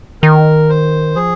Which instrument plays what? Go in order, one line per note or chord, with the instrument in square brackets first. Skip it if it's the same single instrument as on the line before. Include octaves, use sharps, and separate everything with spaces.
[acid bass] D#3 [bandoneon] A#4
[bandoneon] C5
[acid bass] F3 [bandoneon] G#4